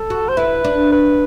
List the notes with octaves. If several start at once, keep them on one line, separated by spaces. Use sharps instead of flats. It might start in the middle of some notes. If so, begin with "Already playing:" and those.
Already playing: A4
F#4
C5
E4 B4
D4
B4